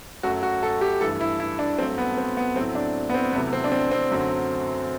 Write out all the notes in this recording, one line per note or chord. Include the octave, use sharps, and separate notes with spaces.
F#2 F#3 A3 F#4
F#4
A4
G4
G2 E3 A3 A4
E4
E4
D4
G2 F#3 A3 C4
B3
C4
B3
A2 F#3 A3 C4
D4
B3
C4
E2 C3 F#3 A3 B3
C4
D4
C4
C4
F#2 D3 F#3 A3